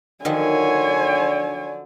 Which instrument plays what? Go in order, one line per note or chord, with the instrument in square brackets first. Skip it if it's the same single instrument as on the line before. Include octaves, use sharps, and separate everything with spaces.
[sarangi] D3 [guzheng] D#3 F3 F#3 [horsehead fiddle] C#5 G#5